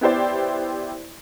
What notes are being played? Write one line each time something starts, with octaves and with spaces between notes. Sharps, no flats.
B3 E4 G4 C5 D5